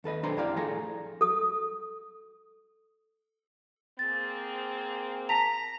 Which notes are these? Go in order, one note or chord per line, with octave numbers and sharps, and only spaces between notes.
D#2 A4 B4 D#5
B1 D4 A4 C5 A#5 C6
F2 E4 G4 D5 F5
A2 F3 G#4 A4 A#5
A4 D#6
A#3 C4 G#4 A6
A5 A#5 B6 F7